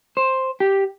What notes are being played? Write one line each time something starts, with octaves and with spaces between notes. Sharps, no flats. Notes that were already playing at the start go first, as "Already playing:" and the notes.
C5
G4